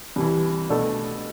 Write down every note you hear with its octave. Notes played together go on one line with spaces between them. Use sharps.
C2 C3 E3
B2 A3 D4 F#4 A4